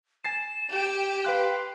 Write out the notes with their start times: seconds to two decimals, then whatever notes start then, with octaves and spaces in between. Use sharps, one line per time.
0.24 G#5 A6 C7 E7
0.72 G4
1.25 B4 F5 C6 F#6